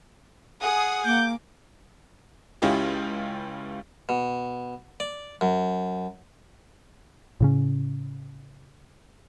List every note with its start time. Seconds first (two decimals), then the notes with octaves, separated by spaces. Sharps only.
0.62 G#4 F#5 D#6
1.05 A#3 D6 G6
2.62 C#2 C#4 E4 F4 G4 D#5
4.09 B2
5.00 D5
5.41 F#2
7.40 A2 C#3 C#4